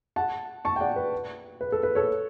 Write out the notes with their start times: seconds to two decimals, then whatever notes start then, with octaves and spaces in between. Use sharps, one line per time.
0.16 F#5 A5
0.65 A5 C#6
0.76 G5
0.80 D5 F#5
0.96 B4
1.61 B4
1.72 A4
1.83 B4
1.95 A4 C#5